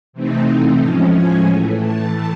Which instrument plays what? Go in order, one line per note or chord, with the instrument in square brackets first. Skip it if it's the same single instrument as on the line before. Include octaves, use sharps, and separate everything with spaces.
[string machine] C3 E3 A3 C4 D#4
A2 F3 G#3 C#4 A5
G#5
A2 E3 A3
A5